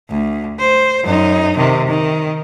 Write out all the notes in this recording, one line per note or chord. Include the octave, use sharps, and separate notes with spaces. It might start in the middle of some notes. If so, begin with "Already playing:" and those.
D2
C5
F#2 D#4
C3 D#3
D#3